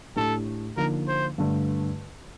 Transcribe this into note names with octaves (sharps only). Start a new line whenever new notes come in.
A2 A3 D4 G4 A4
D3 F3 A#3 D#4 A#4
C5
G2 D3 A3